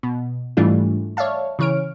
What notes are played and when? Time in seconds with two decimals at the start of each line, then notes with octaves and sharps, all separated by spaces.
0.03 B2
0.57 G#2 E3 G3 A3 D4 F4
1.17 C#5 D5 E5 F5 A5
1.59 C#3 E3 C#5 F6 D7